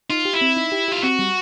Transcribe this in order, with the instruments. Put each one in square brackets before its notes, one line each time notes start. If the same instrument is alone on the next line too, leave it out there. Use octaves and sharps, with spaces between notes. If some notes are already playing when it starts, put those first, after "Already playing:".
[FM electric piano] D#4 [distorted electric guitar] F4
[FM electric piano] G4
[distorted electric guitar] E4
[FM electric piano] C4
D#4
G4
[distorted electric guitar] F4 [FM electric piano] G4
[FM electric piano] C4 [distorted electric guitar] F#4
[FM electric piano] G3